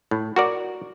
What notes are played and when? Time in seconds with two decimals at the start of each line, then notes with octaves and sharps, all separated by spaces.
0.11 A2
0.36 F#4 A#4 D5